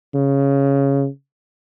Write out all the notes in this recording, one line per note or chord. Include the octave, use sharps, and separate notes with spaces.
C#3